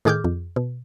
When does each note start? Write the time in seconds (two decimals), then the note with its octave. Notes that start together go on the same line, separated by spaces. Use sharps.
0.05 A2 D#3 G#4 D6 F6 G6
0.24 F2
0.56 B2